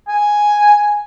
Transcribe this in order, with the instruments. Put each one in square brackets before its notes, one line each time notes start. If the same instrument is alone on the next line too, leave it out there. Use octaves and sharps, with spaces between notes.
[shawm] G#5